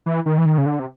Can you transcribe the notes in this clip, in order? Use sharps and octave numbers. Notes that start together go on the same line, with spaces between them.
E3
D#3
E3
D#3
C#3
D3
C3